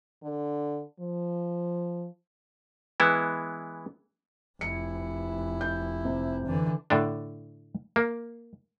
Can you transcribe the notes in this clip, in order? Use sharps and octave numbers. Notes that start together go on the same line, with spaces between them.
D3
F3
E3 G#3 B3 E4
F1 E4 C#7
G6
C3
D3 E3
A2 D3 D4
A#3